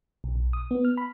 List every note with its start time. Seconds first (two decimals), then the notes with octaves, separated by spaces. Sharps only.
0.24 B1
0.36 B1
0.53 D#6
0.71 B3
0.85 F6
0.97 B5